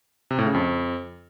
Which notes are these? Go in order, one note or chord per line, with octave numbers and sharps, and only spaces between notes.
C3
A2
C#3
F2